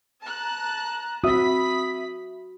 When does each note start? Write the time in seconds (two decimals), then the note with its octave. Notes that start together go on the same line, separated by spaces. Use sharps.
0.23 A5 A#5 F#6
1.24 C4 F#4 E5 B5 D#6 B6